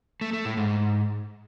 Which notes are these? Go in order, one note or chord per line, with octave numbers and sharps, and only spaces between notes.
A3
A3
A2
G#2